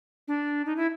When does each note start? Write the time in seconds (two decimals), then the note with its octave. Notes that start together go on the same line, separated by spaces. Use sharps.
0.28 D4
0.66 D#4
0.76 E4